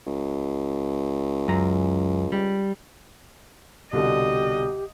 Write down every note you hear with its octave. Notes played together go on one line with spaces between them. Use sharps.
C#2
F#2 A#5
G3
C2 B2 D3 G4 D#5